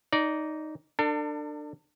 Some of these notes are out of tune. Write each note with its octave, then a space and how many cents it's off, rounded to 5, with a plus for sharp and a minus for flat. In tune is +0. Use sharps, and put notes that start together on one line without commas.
D#4 +0 D5 -20
D4 +20 A4 +45